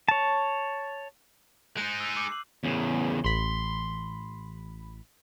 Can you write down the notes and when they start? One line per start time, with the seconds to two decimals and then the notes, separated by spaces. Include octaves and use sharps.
0.09 C#5 A5
1.77 G#3 D#4 F#6 G6 D#7
2.00 E6
2.17 D6
2.28 C7 F#7
2.64 E2 C#3
3.25 A1 B5 C6